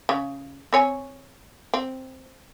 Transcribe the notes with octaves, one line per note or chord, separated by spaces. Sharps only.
C#3
C4 C#5 G#5
C4